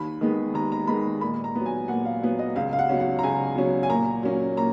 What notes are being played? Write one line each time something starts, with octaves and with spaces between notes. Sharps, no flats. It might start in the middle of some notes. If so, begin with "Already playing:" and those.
Already playing: D#2 B5
D#3 G#3 B3
D#2 A#5
A#5
D#3 G#3 B3 B5
A#2 B5
A#5
F#3 B3
G#5
A#2 F#5
F5
F#3 B3
D#5
C#2 F5
F5
F#5
B2 F#3 C#4
F#5
A#5
C#2 G#5
B2 F#3 C#4
G#5
A#2 A#5
F#3 A#3 C#4
A#2 A#5